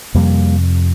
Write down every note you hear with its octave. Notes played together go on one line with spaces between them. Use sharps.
F2 C3 G3 A#3